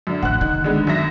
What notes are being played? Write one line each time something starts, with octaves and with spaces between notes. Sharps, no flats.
F#2 D3
A1 F#5 F#6
D#3
D3 G#3 B3
F#2 E5 A#6